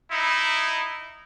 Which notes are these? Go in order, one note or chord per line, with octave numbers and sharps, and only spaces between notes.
D#4 E4